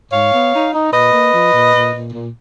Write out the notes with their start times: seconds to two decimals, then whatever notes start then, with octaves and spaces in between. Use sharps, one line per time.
0.12 G#2 C#5 F5
0.32 B3
0.53 D#4
0.73 D#4
0.92 A#2 B4 D#5
1.12 A#3
1.33 F3
1.52 A#2
1.73 A#2
1.93 A#2
2.13 A#2